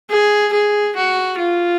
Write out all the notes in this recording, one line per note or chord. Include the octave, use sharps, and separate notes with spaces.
G#4
G#4
F#4
F4